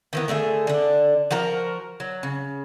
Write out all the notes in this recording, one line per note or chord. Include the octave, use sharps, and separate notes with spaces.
D#3 E3 B3
D3 A3 G#4 E5
D3 D4
F3 F#4 A#4 A#5
F#3
C#3